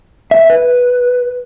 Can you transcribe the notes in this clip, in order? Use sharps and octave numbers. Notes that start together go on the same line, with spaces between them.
E5
B4